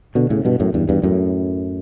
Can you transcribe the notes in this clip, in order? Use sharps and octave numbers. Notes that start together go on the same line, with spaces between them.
B2 D3
A2 C#3
G2 B2
F#2 A2
E2 G2
E2 G2
F#2 A2